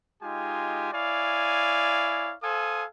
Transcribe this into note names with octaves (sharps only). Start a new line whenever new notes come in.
G#3 D#4 F4 G4 G#5
E4 C#5 D5 F5 G#5
A4 C5 F5 G#5 D#6